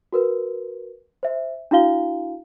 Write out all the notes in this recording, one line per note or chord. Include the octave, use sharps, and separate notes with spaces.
F#4 A#4 B4
C5 E5
D4 E4 F#4 F5 G7